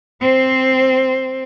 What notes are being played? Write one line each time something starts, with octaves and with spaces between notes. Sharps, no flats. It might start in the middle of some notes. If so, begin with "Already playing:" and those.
C4 C5